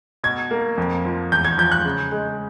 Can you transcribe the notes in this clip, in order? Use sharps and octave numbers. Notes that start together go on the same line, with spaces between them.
B2 G#6
A#3
F2
F3
E2 G6
G#6
F3 G6
F#6
C#3
G#3